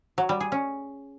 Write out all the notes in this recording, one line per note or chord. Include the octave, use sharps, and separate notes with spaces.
F#3
G3
G#4
C#4